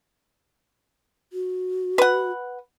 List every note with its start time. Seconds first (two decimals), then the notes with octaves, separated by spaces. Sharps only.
1.33 F#4
1.98 B4 F#5